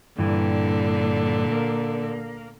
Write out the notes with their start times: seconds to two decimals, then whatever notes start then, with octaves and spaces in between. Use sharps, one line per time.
0.19 G2 A#2 D3 E3
1.52 A#3